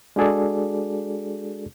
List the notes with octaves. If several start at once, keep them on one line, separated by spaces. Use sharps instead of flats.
G#3 D4 F#4 G#4 A4 D5